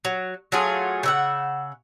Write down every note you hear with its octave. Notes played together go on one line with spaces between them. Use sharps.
F#3
F#3 A3 F4 G#4
C#3 E5 F#5